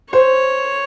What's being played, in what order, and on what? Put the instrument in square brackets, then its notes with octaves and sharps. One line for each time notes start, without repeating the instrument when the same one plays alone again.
[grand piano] C5 [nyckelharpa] C#5